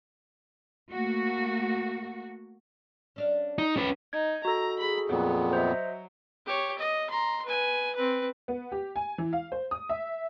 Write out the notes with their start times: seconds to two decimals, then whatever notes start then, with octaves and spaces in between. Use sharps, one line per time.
0.91 A3 A#3 F#4
3.16 C#4 D4 F5
3.58 D#4
3.77 F2 F3 C#4 B4
4.13 D#4 G#6
4.45 F#4 A4 A#5
4.80 G#4 B5
5.10 F2 A#2 F#3 B3
5.53 C5 D#5 E5
6.47 G4 C#5
6.78 D#5
7.10 A#5 C6
7.46 B4 G#5
7.96 C4 B4
8.48 B3
8.72 G4
8.96 G#5
9.18 E3
9.33 F5
9.52 C5
9.71 D#6
9.89 E5